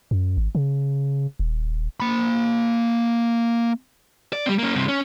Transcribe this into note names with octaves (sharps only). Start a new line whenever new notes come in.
F#2
G#1
C#3
D#1
A#3 B5
D5
G3 C4
A#3 C#4
G2 C3
C#4